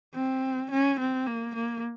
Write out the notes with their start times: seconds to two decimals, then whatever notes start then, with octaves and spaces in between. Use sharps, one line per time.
0.14 C4
0.71 C#4
0.99 C4
1.27 A#3
1.55 A#3